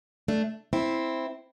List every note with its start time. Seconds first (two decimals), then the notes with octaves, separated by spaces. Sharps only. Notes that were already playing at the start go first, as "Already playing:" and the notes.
0.28 A3 D4
0.73 C4 E4